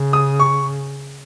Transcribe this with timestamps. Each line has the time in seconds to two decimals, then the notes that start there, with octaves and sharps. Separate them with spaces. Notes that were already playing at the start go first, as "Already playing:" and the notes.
Already playing: C#3
0.13 D#6
0.40 C#6